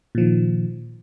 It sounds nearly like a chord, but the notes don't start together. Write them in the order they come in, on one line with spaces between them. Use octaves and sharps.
A#2 F3 D#3